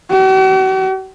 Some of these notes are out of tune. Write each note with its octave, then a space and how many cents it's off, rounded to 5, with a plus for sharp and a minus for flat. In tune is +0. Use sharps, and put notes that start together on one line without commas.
F#4 +45